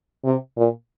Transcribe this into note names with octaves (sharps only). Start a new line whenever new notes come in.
C3
A#2